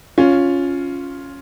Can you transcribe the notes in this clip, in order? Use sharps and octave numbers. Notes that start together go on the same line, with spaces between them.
C#4 F4